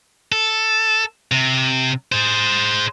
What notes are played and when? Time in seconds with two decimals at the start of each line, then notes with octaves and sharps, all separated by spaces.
0.32 A4
1.32 C3
2.12 G#4 C5